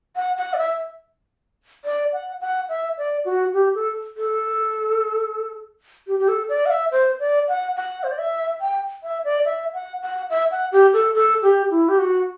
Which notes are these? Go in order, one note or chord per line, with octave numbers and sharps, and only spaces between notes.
F#5
F#5
D5
E5
D5
F#5
F#5
E5
D5
F#4
G4
A4
A4
G4
G4
A4
D5
F#5
E5
C5
D5
F#5
F#5
C5
D5
E5
G5
E5
D5
E5
F#5
F#5
E5
F#5
G4
A4
A4
G4
E4
G4
F#4